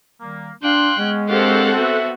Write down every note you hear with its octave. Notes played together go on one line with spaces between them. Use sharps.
D#3 G3 A#3
D4 F5 G5 C6 F#6
G#3 B3 C#4
C4 D4 G4 A4 A#4 C#5 F5 F#5
B3 F#4 E5